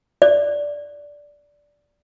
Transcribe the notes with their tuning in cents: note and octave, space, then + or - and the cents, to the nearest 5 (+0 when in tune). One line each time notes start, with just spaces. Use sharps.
D5 -10